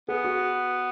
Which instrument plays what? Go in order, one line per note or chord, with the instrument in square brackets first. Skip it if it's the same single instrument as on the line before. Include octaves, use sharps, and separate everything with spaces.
[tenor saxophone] B3 [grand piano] G#4
[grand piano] F#4